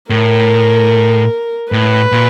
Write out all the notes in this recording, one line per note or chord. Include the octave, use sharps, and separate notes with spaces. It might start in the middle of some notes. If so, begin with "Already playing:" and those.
A2 A#4
A2 B4
A#2